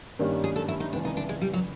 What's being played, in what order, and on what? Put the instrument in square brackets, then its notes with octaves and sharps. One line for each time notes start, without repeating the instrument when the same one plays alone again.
[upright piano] G2 D#3 G3 A#3 C#4
[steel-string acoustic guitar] G#4
A4
E4
D#4
[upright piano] C#2 C3 E3 [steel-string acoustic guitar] D4
[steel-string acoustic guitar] D#4
D4
G#3
G3
F#3